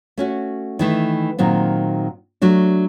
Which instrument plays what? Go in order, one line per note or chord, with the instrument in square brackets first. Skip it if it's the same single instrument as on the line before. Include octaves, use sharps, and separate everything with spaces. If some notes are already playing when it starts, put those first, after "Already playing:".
[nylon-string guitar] A3 C#4 F#4
D#3 E3 A3
A#2 D#3 F#3 C4
F#3 A3 D4